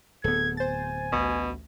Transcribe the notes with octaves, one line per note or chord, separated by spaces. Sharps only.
D1 B3 A4 G#6
C5 G#5 A6
A1 D2 B2